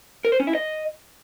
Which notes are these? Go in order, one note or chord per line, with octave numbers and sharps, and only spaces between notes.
A#4
C5
C#4
E4
D#5